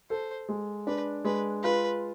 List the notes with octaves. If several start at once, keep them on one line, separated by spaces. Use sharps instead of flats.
A4 C5
G#3
D4 B4
G#3 B4
F4 B4